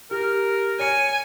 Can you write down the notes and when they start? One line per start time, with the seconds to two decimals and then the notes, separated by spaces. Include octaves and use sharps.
0.11 G4 A#4
0.79 C#5 G#5 C#7